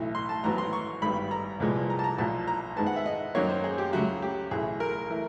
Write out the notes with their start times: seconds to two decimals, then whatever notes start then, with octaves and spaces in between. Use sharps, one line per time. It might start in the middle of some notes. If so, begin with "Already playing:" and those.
Already playing: B1 A2 E3 A3
0.15 C6
0.29 A5
0.44 A1 G#2 D#3 F#3 B3 A#5
0.58 C6
0.73 C#6
1.02 G#1 G2 D#3 G3 B3 B5
1.31 A#5
1.60 C2 A#2 F3 G#3 B3
1.90 A#5
1.99 A5
2.04 A#5
2.18 B1 A#2 F3 A5
2.47 A#5
2.77 G#2 D#3 G#3 B3 A5
2.86 F#5
2.96 E5
3.06 D#5
3.35 F#2 D#3 F#3 A#3 C#5
3.49 C5
3.64 G#4
3.78 G4
3.93 C#2 C#3 F#3 A3 F#4
4.22 G4
4.51 B1 A2 E3 A3 G#4
4.80 A#4
5.10 E3 A3